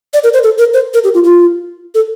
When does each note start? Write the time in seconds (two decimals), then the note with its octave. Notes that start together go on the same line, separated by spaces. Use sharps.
0.14 D5
0.24 A#4
0.34 C5
0.43 A4
0.58 A#4
0.74 C5
0.94 A#4
1.04 G4
1.14 F4
1.24 F4
1.95 A4